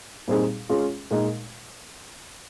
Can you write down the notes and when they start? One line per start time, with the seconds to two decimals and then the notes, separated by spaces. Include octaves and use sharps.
0.28 A#2 G3 C4 D#4 G#4
0.69 G#3 C#4 F4 G#4
1.11 A#2 G#3 D#4 A#4 D#5